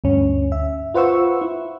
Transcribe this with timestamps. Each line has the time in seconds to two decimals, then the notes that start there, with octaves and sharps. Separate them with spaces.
0.04 D2 G2 C#4
0.52 E5
0.94 F4 B4 C5 F#5 C#6 E6
1.41 E4